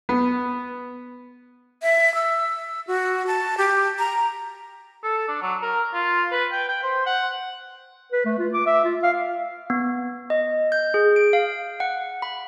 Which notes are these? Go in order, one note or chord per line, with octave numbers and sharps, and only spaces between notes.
B3
E5
E6
F#4
A5
G4
A#5
A4
D4
F#3
A#4
F4
B4
G5
G5
C5
F#5
B4
A3
F4
D6
E5
F4
F5
B3
D#5
G6
G#4
D7
F5
F#5
B5